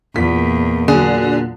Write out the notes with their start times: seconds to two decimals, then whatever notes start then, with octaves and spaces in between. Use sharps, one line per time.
0.16 E2 A#2 B6
0.88 D3 F#3 G#4